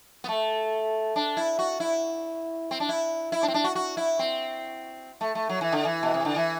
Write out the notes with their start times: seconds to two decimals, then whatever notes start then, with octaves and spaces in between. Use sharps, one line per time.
0.24 B3
0.28 A3
1.16 D4
1.37 E4
1.59 F#4
1.80 E4
2.71 C4
2.80 D4
2.89 E4
3.32 E4
3.43 D4
3.48 C4
3.54 D4
3.64 F#4
3.75 F#4
3.97 E4
4.19 C4
5.21 A3
5.35 A3
5.49 F#3
5.61 E3
5.72 D3
5.85 E3
6.03 B2
6.14 C3
6.25 D3
6.36 E3